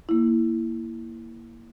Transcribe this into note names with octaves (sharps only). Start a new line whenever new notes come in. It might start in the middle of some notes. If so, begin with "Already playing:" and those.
A#3 E4